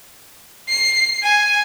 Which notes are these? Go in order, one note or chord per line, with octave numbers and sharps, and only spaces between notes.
C7
G#5